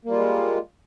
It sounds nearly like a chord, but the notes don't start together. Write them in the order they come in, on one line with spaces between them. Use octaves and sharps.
A#3 G3 F4 G#3